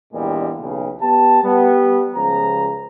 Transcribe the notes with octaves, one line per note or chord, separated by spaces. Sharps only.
E2 G2 A#2 G3 G#3
B1 C#3
B3 G4 A5
G3 B3
C#2 C#3 F3 A#5